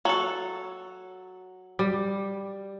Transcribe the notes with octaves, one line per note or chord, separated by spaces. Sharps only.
F#3 A4
G3